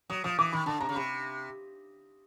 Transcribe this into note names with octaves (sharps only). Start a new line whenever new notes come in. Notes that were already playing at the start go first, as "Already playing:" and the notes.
F#3 D#6
F3 D#6
E3 D6
D#3 B5
D3 A5
C3 A#5
C#3
C3 B5